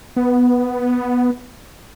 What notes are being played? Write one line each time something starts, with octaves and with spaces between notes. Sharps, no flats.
B3